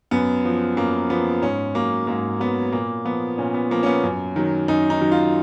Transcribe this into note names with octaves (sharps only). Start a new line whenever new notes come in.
F#2 B3
F3
F#2 A#3
F3 B3
G#2 C#4
F#3 A#3
G#2 A#3
F#3 B3
A#2 A#3
F3 B3
A#2 C#4
B3
F3 A#3
C#4
B3
F#2
D#3 F#3
F#2 D#4
D#4
D#3 F#3
F4